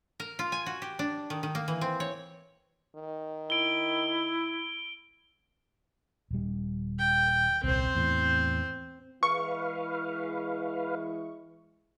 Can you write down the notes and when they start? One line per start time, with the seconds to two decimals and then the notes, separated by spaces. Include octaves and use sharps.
0.20 A#4
0.39 F4
0.52 G#5
0.66 F#4
0.82 G4
0.99 D4
1.30 D#3
1.43 D#3
1.55 A#3
1.68 E3
1.81 C4
2.00 C#5
2.96 D#3
3.50 E4 D7 G7
6.31 D#1 G3
6.99 G5
7.64 D#1 C2 C4 C5
7.95 E2 A2
9.23 E3 G#3 E4 B4 F5 C#6